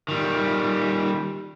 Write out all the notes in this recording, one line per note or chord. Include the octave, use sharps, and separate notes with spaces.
D#3 G3